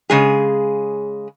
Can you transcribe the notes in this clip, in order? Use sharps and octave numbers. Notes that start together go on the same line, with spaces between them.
C#3 G#3 G#4